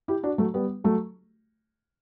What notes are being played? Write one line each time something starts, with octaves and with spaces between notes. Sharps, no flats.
E4 G4
D4 F#4
F#3 A3
G3 B3
F#3 A3